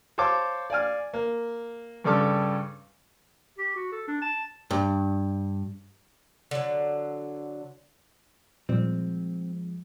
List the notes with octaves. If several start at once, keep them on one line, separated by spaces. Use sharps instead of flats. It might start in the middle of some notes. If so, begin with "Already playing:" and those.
C5 C#5 F5 A5 D6
D5 F5 G#5 F6
A#3
G2 C#3 G3 A4 D6 F6
G4
F#4
A4
D4
A5
G2
D3 F#3
A#2 F3 G3 G#3 C4